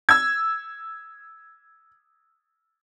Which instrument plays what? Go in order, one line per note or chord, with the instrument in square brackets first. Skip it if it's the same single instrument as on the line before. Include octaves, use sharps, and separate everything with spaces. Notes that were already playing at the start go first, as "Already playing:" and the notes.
[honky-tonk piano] E6 G#6